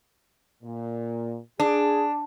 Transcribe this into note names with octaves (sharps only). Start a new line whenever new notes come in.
A#2
D4 G#4